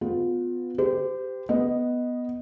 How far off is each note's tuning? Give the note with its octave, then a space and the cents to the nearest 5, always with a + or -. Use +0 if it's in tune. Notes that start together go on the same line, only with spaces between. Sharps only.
B3 +25 F4 +25
G4 +0 C5 -35
B3 +0 D#5 +0